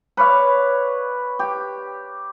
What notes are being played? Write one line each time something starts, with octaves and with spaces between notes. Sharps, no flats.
B4 C#5 D5 F5
G4